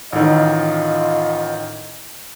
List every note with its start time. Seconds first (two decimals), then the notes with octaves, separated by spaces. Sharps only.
0.13 A1 D#3 F4 D#5